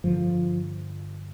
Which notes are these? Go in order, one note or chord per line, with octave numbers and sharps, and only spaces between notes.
G2 D3 F3